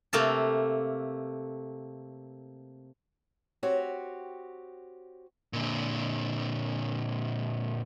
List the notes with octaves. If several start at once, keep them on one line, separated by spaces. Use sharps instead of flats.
C3 A3 A#3 F5 A5
C4 F#4 G4 C#5
A#2 D3